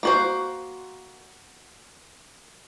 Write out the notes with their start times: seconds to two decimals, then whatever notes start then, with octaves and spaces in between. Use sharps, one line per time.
0.03 A#3 F#4 C5